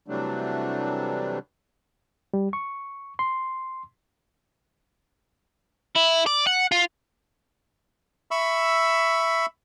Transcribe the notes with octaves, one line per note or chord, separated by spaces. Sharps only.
C3 E3 F#3 G3 A3 D4
G3
C#6
C6
E4
D5
F#5
F4
E5 B5 C#6 E6